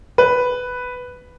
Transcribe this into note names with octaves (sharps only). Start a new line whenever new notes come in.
B4